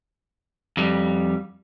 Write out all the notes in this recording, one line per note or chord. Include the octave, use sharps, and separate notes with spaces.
F2 G3